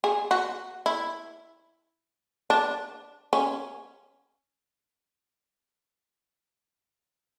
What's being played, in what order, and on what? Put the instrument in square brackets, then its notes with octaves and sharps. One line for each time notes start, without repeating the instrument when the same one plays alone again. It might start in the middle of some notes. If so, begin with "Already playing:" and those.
[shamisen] G#4
F#4
E4
D4
C#4